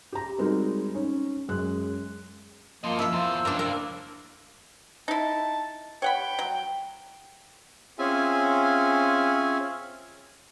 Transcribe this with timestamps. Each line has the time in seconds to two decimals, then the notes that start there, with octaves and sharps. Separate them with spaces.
0.13 G4 A#5
0.38 G3 G#3 C4 D#4 F#4 A#4
0.94 C#4 D#4
1.48 F#2 G#3 F#6
2.84 G2 F3 A#3 D#5 C6
2.99 E4 F4 E6
3.13 E2 F3 C5
3.45 G2 A#3 D4 A#4
3.59 A#4
5.08 D#4 E4 A5
6.02 C#5 F#5 G5 B5
6.39 F#3
7.99 C4 C#4 F4 G#4 E5 G#5